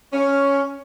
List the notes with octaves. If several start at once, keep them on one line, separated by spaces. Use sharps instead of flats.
C#4